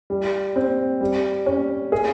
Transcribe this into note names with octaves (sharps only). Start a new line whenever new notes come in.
G3
C4
G3
C#4
G#4